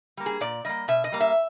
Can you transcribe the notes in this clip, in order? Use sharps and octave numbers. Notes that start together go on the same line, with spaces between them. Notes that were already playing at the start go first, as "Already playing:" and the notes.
G3 A#3
G#4
A#2 D5
G3 A#3 D#5
B2 E5
D#5
G3 A#3
E5